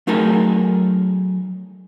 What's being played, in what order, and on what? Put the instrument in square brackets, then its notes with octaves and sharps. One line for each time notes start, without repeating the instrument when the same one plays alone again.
[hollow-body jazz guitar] F#3 A3 D#4 G#4 A#4 A5